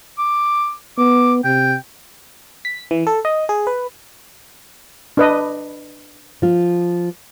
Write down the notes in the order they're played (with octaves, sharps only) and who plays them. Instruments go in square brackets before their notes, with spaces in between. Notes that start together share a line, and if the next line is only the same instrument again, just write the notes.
[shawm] D6
[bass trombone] B3 [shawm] D6
[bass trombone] C3 [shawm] G5
[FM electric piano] B6
E3
A4
D#5
G#4
B4
[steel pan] D4 B4 D#5
[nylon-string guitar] F3 F4